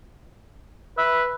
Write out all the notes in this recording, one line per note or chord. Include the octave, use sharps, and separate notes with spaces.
B4 E5